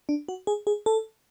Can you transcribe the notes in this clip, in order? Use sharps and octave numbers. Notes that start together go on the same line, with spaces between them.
D4
F#4
G#4
G#4
A4